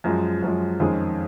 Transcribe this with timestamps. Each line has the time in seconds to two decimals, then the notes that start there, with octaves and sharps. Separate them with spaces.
0.04 F#2 F3 G#3
0.42 F#2 F3 G#3
0.80 F2 D#3 G#3 C#4 G#4